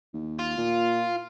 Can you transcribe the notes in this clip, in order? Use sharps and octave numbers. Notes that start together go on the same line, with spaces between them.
D#2
F4
A#2